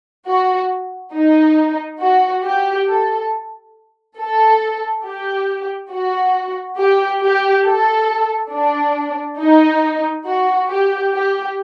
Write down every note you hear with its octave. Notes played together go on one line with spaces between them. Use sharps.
F#4
D#4
F#4
G4
A4
A4
G4
F#4
G4
G4
A4
D4
D#4
F#4
G4
G4